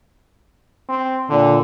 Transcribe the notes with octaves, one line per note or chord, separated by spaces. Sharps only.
C4
A#2 D3